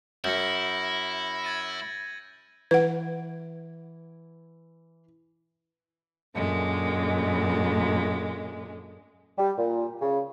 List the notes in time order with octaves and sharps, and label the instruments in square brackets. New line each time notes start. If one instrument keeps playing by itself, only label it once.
[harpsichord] F#2 [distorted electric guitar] E4 [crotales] G6 A#6 C#7
[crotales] G#6 A6 D#7
[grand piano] E3 [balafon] B4 F#5
[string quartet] F#2 A#2 D3 G#3
[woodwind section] G3
A#2
C#3